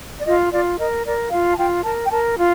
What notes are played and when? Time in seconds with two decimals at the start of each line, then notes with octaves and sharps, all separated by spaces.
0.18 D5
0.25 F4 D#5
0.53 F4 D5
0.78 A#4 D#5
1.05 A#4 D5
1.31 F4 F5
1.53 A5
1.57 F4 G5
1.83 A#4 A5
2.06 G5
2.10 A#4 A5
2.36 F4